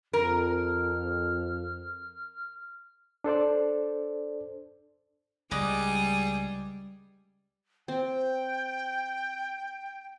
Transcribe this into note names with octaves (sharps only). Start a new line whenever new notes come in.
F2 A#4 F6
D4 A4 C5 D5
C#2 G3 G#4 B4 D5 D#5
C4 G5